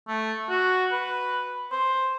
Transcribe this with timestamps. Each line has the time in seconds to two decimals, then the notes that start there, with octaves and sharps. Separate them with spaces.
0.08 A3
0.49 F#4
0.92 B4
1.72 C5